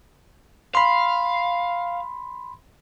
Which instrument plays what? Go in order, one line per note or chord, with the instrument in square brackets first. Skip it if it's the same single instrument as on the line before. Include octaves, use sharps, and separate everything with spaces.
[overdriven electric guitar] F5 [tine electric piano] B5 C6